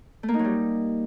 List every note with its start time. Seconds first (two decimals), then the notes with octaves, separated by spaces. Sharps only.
0.23 A3
0.28 A#3
0.34 D#4
0.39 F#3
0.45 G3